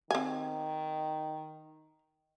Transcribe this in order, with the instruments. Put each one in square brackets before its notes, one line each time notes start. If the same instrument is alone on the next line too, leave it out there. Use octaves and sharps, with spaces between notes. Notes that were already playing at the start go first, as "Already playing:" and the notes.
[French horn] D#3 [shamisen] C4 G#5